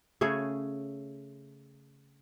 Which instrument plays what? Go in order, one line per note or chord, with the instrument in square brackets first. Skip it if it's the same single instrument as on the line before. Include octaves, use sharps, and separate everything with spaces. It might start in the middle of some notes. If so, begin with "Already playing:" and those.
[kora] C#3 A3 G#4 C#5